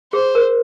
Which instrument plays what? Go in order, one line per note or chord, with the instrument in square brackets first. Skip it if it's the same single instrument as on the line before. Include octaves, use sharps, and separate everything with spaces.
[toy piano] G#4 [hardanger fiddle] C5
[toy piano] A#4